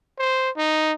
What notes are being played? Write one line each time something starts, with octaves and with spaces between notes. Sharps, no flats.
C5
D#4